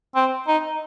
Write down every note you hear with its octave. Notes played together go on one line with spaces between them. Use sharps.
C4
D#4